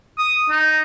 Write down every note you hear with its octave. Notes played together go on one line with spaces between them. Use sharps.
D#6
D#4